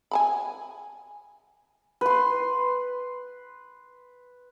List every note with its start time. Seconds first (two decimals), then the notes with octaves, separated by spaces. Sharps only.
0.11 G#5 A5 B5
2.01 B4 C6